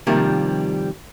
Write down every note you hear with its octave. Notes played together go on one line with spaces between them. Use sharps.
C3 D#3 F3 G3 A#3